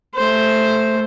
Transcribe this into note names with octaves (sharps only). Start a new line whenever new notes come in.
A3 C5